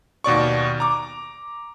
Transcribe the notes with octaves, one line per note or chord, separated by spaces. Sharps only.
D#2 B2 D5 C#6
A#5 D6